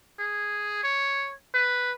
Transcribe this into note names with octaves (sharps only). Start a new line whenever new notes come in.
G#4
C#5
B4